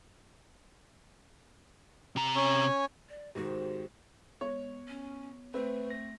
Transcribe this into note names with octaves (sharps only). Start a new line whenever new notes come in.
C3 A#5
C#4 C#5 G#5
D5
G#2 C3 D#3 F#4
G#3 B3 C#5
C#4
A3 C4 B4
A#6